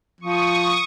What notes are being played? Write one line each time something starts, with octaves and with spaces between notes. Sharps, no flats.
F3 C#6 D#6